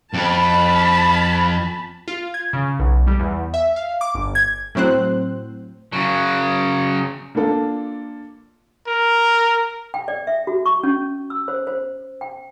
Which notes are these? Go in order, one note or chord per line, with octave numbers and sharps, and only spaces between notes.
F2 A5 B5
F4
G#6
C#3
B1
G3
E2
E5
F5
D6
G1
G#6
A2 F#3 C4 C5 F#6
C#3 F#3
A#3 D4 F4 A4
A#4
G5
D5
E5
F#4
C#6
C#4
E6
C5
C5
G5